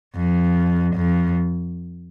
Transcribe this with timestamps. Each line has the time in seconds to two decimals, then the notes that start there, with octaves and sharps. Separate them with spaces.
0.15 F2
0.96 F2